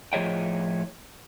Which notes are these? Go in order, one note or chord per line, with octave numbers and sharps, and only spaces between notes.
A2 F3 G#4 C#5 D#5 G5